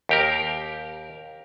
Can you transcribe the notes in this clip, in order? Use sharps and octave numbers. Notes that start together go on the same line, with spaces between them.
D#2 G4 A#4